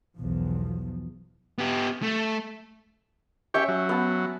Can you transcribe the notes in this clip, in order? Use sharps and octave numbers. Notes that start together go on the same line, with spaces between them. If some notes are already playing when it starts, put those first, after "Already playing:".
B1 E2 F3
B3 G4
A3
C#4 G4 C#5 E5 G5
F#3
B3 A5